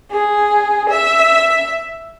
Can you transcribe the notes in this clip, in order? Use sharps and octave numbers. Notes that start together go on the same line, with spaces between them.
G#4
E5